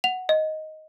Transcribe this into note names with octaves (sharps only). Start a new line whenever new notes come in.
F#5 F7
D#5